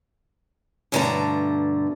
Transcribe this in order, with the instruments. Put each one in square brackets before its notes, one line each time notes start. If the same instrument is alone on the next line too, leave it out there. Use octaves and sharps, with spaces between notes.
[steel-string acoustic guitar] G2 B2 D3 A3 A5 A#5